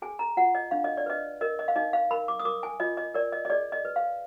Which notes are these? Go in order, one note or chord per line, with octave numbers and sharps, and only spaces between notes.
G#4 G#5
A#5
F4 F#5
D#5
D4 F5
D#5
D5
B4 D#5
A#4 D#5
D#5
F5
D#4 D#5
F5
A#4 B5
D6
D#6
A#4 D6
G#5
F4 D#5
D#5
A#4 D5
D#5
D#5
G#4 D5
D#5
B4
F5